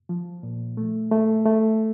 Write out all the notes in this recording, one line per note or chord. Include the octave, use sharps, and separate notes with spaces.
F3
A#2
A3
A3
A3